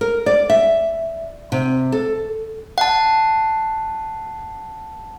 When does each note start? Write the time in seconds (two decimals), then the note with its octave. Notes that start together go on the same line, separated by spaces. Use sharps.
0.01 A#4
0.26 D5
0.50 E5
1.52 C3
1.92 A4
2.78 F#5 A5